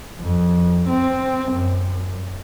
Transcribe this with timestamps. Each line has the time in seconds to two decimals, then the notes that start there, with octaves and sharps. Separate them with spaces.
0.20 F2
0.88 C4
1.52 F#2